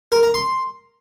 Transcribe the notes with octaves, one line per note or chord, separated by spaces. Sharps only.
A#4
A#5
C6